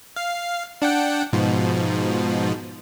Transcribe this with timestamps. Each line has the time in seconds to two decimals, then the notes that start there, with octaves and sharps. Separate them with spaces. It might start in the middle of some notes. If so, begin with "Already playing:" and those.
0.16 F5
0.82 D4 F#5 G5
1.33 G#2 B2 F3